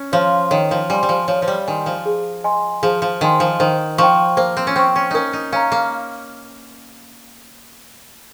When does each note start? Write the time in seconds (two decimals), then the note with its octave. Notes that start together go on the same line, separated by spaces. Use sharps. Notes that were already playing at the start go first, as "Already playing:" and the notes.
Already playing: C#4
0.12 F3 C#5 F5 C6
0.51 D#3 C#5
0.71 F3
0.90 G3 G#5 C6
1.03 G3
1.09 F3
1.28 F3 C#5
1.42 F3
1.48 G3
1.67 D#3 G#5 C6
1.86 F3
2.06 G#4
2.44 D#5 G#5 C6
2.83 F3 G#4
3.02 F3
3.21 D#3 D#5 G#5 C6
3.40 F3
3.60 D#3 C5
3.98 F3 G5 C#6
4.37 A#3 C5
4.57 C4
4.67 C#4
4.76 C4 G5 C#6
4.96 C#4
5.11 C#4 D#4 A#4
5.33 D#4
5.53 C#4 F5 A#5
5.72 A#3